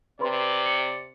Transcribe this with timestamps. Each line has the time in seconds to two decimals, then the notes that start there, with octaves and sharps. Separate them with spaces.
0.20 C3 B4 D5 B5 C6
0.66 C#7